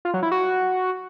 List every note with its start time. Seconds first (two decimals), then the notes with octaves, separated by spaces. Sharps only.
0.05 F4
0.14 F#3
0.23 E4
0.32 F#4